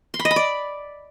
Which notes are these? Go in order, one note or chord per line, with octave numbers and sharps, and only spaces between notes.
C6
B5
D#5
B5
D5